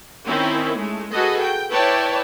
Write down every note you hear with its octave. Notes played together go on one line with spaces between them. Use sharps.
D#3 C4 C#4 D#4 E4
G#3 A3
F#4 G#4 A4 B4 D#5
G5
E4 B4 C#5 D5 G5 A5